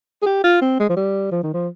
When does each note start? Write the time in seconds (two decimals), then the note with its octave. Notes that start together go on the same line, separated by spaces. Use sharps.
0.22 G#4
0.26 G4
0.44 F4
0.61 C4
0.80 G#3
0.89 F3
0.97 G3
1.32 F3
1.43 D#3
1.54 F3